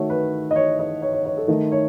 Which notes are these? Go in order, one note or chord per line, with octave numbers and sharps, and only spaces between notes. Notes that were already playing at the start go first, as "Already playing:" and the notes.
Already playing: D#3 A3 F#4 C#5
B4
D#5
C#5
D#5
C#5
C#5
C#5
A4
D#3 A3
C#5